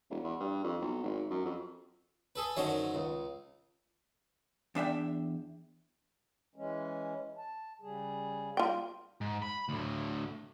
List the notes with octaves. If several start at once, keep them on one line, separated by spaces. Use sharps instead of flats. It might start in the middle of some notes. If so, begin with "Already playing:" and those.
E1
E2
G2
F2
B1
G#1
F#2
F2
G#4 A4 B4
F#2 D3 D#3 C5 C#5 C6
C#2
E2 D4 E5 G5
E3 G#3 C#4
A5
C#3 G3 G#4
G3 F4 G5
G#2
B5
D2 A2